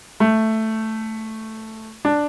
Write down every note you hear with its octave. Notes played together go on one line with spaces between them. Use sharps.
A3
D4